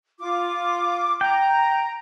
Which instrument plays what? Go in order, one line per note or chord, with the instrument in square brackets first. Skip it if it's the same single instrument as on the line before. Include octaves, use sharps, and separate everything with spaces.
[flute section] F4 D6
[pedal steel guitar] G5 [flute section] A#5